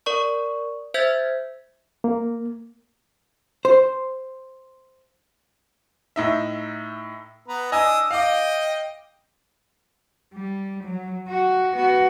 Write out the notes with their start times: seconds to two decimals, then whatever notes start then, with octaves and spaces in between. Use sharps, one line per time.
0.06 A#4 D5 C#6
0.94 C5 E5 E6 G6 G#6 B6
2.04 A#3
3.65 C5
6.16 A2 D#4 E5
7.48 B3 B4 A#5
7.72 D4 D#5 G#5 D#6 E6
8.11 D#5 F5 G5 D6
10.34 G3
10.84 F#3
11.28 F#4
11.74 B3 F#4